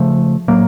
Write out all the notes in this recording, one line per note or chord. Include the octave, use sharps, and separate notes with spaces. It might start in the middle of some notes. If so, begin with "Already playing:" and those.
Already playing: C#3 F3 A3
A2 F#3 A#3